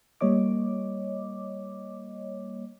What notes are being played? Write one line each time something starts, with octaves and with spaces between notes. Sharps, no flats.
G3 A#3 C#5 D#5 D6